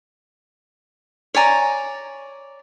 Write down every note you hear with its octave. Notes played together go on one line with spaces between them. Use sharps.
C#5 D5 G#5 A#5